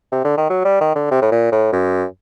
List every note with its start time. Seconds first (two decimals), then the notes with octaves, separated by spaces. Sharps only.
0.12 C3
0.25 D3
0.37 D#3
0.50 F#3
0.65 G3
0.81 D#3
0.96 D3
1.11 C3
1.22 A2
1.32 A#2
1.52 A2
1.72 F#2